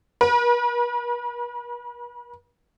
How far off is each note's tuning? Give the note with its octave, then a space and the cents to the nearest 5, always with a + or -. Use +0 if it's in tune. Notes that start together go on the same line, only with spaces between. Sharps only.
B4 -45